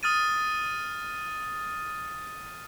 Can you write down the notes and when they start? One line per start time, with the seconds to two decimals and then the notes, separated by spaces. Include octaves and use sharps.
0.03 D#6 F6 A6 D#7